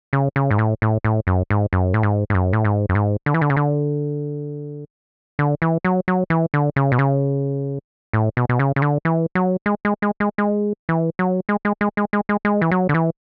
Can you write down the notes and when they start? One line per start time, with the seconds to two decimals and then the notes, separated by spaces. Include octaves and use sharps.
0.13 C#3
0.36 C#3
0.51 G#2
0.58 A2
0.82 A2
1.04 A2
1.27 F#2
1.50 G#2
1.73 F#2
1.94 A2
2.03 G#2
2.30 G#2
2.34 F#2
2.53 A2
2.65 G#2
2.89 F#2
2.95 G#2
3.26 D3
3.34 E3
3.41 D3
3.50 C#3
3.57 D3
5.39 D3
5.62 E3
5.85 F#3
6.08 F#3
6.30 E3
6.54 D3
6.76 C#3
6.92 B2
6.99 C#3
8.13 A2
8.37 B2
8.49 B2
8.59 C#3
8.76 C#3
8.82 D3
9.05 E3
9.35 F#3
9.66 G#3
9.85 G#3
10.02 G#3
10.20 G#3
10.38 G#3
10.89 E3
11.19 F#3
11.49 G#3
11.65 G#3
11.81 G#3
11.97 G#3
12.13 G#3
12.29 G#3
12.45 G#3
12.62 E3
12.71 F#3
12.89 D3
12.94 E3